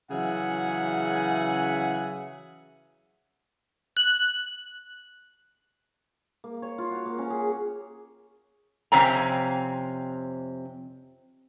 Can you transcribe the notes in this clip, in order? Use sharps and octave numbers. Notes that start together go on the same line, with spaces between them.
C#3 E3 F#3 G#4 E5 F#5
F#6
A#3
C#5
F4
F#4
A#3
C#4
G#4
F2 C3 C4 C#4 A#5